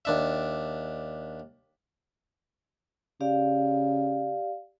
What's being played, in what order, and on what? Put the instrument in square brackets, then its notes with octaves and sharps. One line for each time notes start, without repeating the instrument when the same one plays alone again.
[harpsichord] D#2 D4 E5
[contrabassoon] C#3 [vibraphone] G4 D5 F5